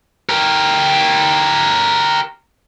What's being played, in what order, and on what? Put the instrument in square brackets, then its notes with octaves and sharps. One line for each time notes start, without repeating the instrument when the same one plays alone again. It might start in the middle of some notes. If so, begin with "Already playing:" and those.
[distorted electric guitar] G4 A#4